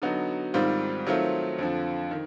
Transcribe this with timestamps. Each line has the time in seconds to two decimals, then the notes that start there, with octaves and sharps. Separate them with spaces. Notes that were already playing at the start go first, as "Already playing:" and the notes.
0.02 D3 F#3 B3 D#4 F#4
0.54 G#2 D#3 G3 C4 F4
1.06 D#3 F#3 A3 C4 F4
1.58 F2 D3 F3
2.11 D#3